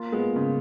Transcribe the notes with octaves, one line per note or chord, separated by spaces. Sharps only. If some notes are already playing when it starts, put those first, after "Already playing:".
Already playing: A#3 F4
G#3 B3
C#3